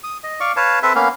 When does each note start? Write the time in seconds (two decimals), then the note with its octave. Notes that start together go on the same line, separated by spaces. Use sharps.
0.04 D#6
0.23 D#5
0.40 D5 F5 C#6
0.56 B4 C#5 F5 A5
0.83 C4 A4 B4 E5
0.95 A#3 B3 C#4 F5